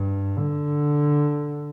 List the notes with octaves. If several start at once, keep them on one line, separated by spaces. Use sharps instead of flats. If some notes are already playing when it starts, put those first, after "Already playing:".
Already playing: G2
D3